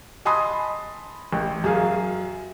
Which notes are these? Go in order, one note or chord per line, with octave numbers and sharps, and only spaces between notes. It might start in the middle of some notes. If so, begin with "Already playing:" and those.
D#5 G#5 A5 B5 C6 D#6
A1
F#2 F#3 G#4 F5